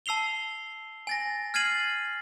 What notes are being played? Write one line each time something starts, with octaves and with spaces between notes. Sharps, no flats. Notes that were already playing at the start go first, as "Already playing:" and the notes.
A5 E6 C7 F7 G7
G#5 A6 A#6
F6 G#6 A6 C7 D#7 F#7